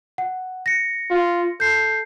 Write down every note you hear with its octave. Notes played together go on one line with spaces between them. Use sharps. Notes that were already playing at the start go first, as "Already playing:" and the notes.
F#5
A#6 C#7
F4
A4 G6 C7